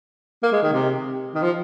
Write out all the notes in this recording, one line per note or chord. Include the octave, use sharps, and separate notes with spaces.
A#3
G#3
D#3
C3
D#3
F3